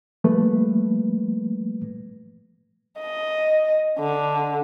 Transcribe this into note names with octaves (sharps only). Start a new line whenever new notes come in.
F3 G3 A3 A#3 B4
D#5
D3